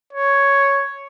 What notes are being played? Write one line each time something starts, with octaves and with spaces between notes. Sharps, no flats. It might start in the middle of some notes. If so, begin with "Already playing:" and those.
C#5